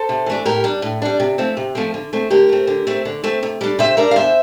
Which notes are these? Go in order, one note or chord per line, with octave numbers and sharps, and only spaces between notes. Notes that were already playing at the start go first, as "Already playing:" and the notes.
Already playing: A4 C5
C3
E3 A3 D4
A2 G4 A#4
G3 D4
A2
G3 D4
C3
F3 A3 C4
C3
F3 A3 C4
D3
A3 C4
D3 G4 A#4
A3 C4
D3
A3 C4
D3
A3 C4
C3
G3 D4
C3 C5 E5
G3 D4 A#4 D5
F5
E2 C5 E5